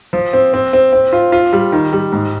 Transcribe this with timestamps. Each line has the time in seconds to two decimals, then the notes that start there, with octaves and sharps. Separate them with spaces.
0.13 F3
0.33 C4
0.54 C4
0.73 C4
0.93 C4
1.13 F4
1.32 F4
1.53 G3
1.72 D#3
1.93 G3
2.12 G#2